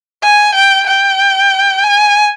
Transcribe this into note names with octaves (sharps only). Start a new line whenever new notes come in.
G#5
G5
G5
G#5